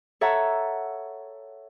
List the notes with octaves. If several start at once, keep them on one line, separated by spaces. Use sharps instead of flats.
A4 C#5 E5 F#5 A#5